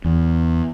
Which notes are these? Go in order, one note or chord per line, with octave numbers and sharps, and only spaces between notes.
E2